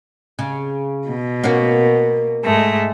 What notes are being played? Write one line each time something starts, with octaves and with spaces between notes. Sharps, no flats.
C#3
B2
A#3 C#4 F#4
G#2 G#3 A3